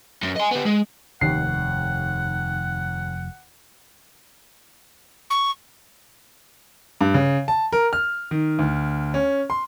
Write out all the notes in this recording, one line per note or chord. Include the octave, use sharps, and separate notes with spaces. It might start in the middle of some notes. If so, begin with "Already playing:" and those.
F#2
D#5 G#5
B3 G4
G#3
F1 D#2 F#5 C7
C#6
G2
C#3
A5
A#4
F6
D#3
D2
C#4
C6